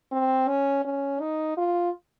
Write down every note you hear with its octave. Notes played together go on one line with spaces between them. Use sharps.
C4
C#4
C#4
D#4
F4